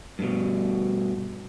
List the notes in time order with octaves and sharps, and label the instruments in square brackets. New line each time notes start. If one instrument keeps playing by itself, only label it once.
[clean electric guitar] G2 B2